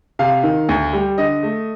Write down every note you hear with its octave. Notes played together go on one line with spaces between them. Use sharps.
C3 F5
D#3
D2
G3
D3 D#5
A3